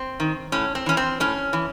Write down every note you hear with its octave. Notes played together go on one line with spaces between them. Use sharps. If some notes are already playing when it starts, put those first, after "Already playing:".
Already playing: C4
D#3
A2 C#4
C4
E3 C#4
C4
A2 C#4
E3